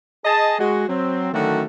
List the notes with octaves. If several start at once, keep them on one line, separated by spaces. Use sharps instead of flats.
G#4 D#5 A5
G#3 F#4
F#3 C4
D3 D#3 F#3 A3 C#4 F#4